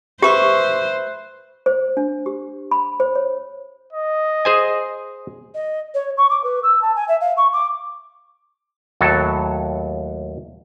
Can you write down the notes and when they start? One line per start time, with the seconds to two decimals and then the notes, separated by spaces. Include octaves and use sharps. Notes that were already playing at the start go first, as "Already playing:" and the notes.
0.22 G4 B4 C5 E5 C#6
1.66 C5
1.97 D4
2.26 G4
2.71 B5
3.00 C5
3.15 C#5
3.93 D#5
4.45 G#4 C5 G#5
5.54 D#5
5.94 C#5
6.17 C#6
6.29 D6
6.43 B4
6.63 E6
6.81 A5
6.95 G#5
7.08 E5
7.20 F5
7.37 C#6
7.52 D6
9.01 D#2 A2 F#3 A4